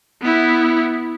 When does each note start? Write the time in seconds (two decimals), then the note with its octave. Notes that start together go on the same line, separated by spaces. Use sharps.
0.22 B3 E4